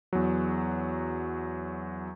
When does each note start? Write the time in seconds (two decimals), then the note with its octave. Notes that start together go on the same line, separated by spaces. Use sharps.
0.13 E2 F#3